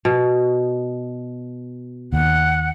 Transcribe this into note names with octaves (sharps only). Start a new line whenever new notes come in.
B2
D#2 F#5